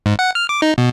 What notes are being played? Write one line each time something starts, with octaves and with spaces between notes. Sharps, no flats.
G#2
F#5
F6
D6
D#4
B2